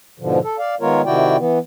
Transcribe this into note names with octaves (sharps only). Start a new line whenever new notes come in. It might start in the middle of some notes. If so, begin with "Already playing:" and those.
G#2 B2 D3 F3
A4
D5 F5
D#3 G#3 B3 F4 A#4 C#5
C3 D#3 E4 F#4 D5 G5
E3 B3